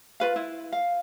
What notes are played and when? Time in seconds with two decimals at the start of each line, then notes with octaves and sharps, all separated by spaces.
0.20 F4 B4 F5
0.36 E4
0.72 F5